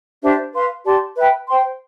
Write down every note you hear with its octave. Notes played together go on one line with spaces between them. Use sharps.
D4 G4 C5 E5
B4 F5 C6
G4 D5 A5 C6
B4 E5 G5 B5
C5 G5 C6